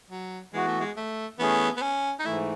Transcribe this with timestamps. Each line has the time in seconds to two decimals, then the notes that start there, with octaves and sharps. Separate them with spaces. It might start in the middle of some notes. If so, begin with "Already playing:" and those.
0.10 F#3
0.53 E3 G#3 B3 F#4
0.67 A3
0.80 G#3
0.97 A3
1.39 E3 A3 B3 C#4 G#4
1.76 B3
1.82 C#4
2.19 D#4
2.25 G#2 E3 A3 E4